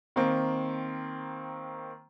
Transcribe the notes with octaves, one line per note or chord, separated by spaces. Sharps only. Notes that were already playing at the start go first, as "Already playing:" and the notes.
D#3 A#3 C4